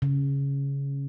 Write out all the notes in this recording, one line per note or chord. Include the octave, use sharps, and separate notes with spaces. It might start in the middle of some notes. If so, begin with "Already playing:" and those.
C#3